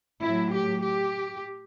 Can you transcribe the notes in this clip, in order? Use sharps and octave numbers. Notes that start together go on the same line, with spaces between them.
A2 F#3 E4
G4
G4